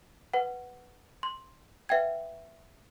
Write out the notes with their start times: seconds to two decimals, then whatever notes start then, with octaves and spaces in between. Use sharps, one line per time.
0.34 B4 F#5
1.23 C6
1.89 B4 E5 F#5 G5 G#6